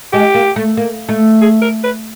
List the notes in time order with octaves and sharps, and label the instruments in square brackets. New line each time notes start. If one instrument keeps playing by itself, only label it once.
[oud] G#3 [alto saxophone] G4
[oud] A#3
A3
A#3
A3
[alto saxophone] G#4
A#4
B4